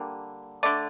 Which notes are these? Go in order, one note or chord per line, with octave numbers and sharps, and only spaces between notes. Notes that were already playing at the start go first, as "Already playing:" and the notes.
Already playing: D3 G3 A#3
D3 A3 D5